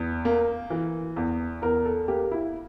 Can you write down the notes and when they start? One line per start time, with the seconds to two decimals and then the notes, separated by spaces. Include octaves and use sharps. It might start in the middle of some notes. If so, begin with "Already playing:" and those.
Already playing: E2
0.25 A#3
0.70 E3
1.16 E2
1.62 E2 A#4
1.85 A4
2.08 A#3 G4
2.31 E4